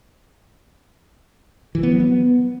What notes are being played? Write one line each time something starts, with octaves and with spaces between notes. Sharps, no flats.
E3
B3
F#3
B3